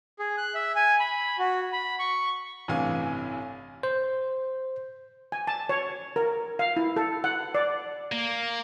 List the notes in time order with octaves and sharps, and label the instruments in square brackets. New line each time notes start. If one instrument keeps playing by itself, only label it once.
[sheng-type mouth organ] G#4
F#6
E5
G#5
B5
F#4
B5
C#6
[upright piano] A1 G2 C3 E3 F5 G#5
[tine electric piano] C5
[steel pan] G#5
A5
C#5
A#4
F5
E4
A4
F#5
D5
[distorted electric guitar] A#3